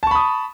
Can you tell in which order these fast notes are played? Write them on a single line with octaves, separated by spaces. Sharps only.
A5 C#6 B5 D#6